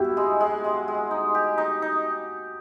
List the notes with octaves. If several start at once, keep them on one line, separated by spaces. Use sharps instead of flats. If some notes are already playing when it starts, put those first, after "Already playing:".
Already playing: E4 F#4 G4
G#3
G#3
G#3
G#3
D#4
G4
D#4
D#4